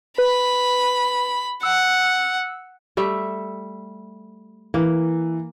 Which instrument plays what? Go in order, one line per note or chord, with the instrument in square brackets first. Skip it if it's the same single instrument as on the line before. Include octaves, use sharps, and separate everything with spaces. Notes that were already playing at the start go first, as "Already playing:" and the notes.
[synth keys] B4 [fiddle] B5
[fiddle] F#5 [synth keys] E6
[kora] G3 A3 E5
[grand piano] E3 [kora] A#3